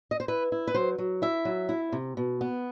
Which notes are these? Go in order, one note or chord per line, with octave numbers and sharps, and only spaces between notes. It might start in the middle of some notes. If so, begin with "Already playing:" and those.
D#5
C5
E4 B4
E4
B4
F#3 C5
F#3
E4 E5
F#3
E4
C3
B2
B3